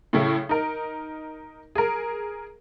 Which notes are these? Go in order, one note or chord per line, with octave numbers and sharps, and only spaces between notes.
A2 C#3 A3 E4
D#4 A#4
G#4 A#4